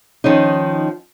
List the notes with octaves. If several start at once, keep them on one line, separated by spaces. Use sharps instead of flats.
D#3 F3 C#4 D#4